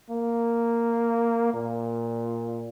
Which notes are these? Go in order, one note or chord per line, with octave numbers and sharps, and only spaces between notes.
A#3
A#2